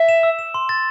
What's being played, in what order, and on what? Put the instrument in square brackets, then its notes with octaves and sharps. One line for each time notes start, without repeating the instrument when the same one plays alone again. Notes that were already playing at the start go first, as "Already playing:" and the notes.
Already playing: [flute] E5
[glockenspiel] E7
E6
E7
C6
A6